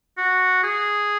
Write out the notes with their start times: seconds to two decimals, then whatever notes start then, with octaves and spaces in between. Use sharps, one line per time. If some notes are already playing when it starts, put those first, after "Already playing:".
0.18 F#4
0.63 G#4